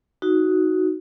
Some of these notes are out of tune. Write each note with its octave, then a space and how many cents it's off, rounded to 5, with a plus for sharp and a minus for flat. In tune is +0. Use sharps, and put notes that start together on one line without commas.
D#4 +10 F#4 +0